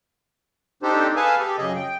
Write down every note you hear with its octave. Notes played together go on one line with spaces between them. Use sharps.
C4 D4 D#4 G4 A4 C5
G#4 A4 B4 F5 G#5 A5
G4 A4
F#2 C#3 G#4 D#5
G5